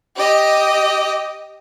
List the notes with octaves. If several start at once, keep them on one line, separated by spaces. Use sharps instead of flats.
G4 D#5